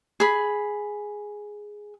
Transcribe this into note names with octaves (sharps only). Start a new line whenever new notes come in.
G#4 B5